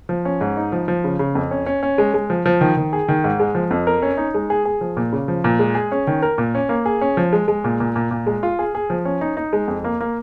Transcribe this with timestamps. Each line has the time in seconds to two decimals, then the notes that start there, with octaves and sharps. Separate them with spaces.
0.09 F3
0.25 C#4
0.41 G#2
0.57 D#4
0.72 F3
0.88 F3
1.04 C#3
1.19 C#3
1.35 F2
1.51 C#4
1.66 C#4
1.83 C#4
1.98 G#3
2.14 G#3
2.30 F3
2.46 F3
2.61 D#3
2.77 D#3
2.93 G#4
3.08 D#3
3.24 G#2
3.40 G#3
3.55 F3
3.71 F2
3.87 A#4
4.02 C#4
4.18 D#4
4.34 G#3
4.50 G#4
4.65 G#4
4.81 F3
4.97 A#2
5.13 C#3
5.28 F3
5.44 A#2
5.59 G#3
5.75 G#4
5.92 C#4
6.07 D#3
6.22 A#4
6.38 A#2
6.55 C#4
6.69 A#3
6.85 G#4
7.01 C#4
7.17 F3
7.33 G#3
7.48 G#3
7.64 A#2
7.80 A#2
7.96 A#2
8.11 A#2
8.26 G#3
8.43 F4
8.59 G#4
8.75 G#4
8.90 F3
9.05 C#4
9.21 D#4
9.37 D#4
9.53 G#3
9.68 F2
9.84 A#3
10.00 A#3